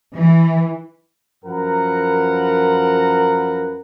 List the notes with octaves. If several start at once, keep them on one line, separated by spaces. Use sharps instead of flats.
E3
F#2 F3 A#4 B4 F#5 A#5